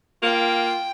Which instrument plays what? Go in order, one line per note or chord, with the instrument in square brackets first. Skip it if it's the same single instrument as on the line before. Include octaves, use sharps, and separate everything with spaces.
[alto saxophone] A#3 [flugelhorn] F4 [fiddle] G5